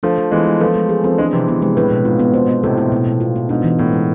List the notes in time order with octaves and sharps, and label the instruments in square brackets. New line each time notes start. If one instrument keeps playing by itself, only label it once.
[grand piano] F3 A3 [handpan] D4
[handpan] F3
[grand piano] E3 G#3 [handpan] B3
[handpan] G#3
[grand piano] F3 A3 [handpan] B4
[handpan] G#3
G#4
[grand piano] F3 A3 [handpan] C4
[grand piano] E3 G#3 [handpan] D4
[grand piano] C3 E3 [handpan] F3
[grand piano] C3 E3 [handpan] B3
[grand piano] C3 E3 [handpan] G#3
[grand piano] A2 [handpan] B4
[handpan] B2
[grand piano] G#2 [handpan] F4
[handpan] B3
[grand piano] G#2 B2 [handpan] C5
[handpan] B3
[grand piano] A2 C3 [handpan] A4
[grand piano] A2 [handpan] E4
[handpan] B2
B2
F4
B3
[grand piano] G#2 [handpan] D4
[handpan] E3
[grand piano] A2 [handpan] B3
[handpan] G#3